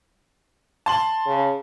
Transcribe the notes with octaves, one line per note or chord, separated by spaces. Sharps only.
A5 C6 F#7
C#3